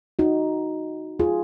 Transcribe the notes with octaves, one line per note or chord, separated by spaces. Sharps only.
D#4 F#4
F4 G#4